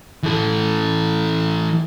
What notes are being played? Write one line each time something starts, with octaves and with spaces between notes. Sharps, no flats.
E3 A4